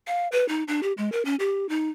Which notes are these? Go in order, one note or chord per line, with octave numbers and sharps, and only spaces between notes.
F5
B4
D#4
D4
G4
G#3
A#4
C#4
G4
D#4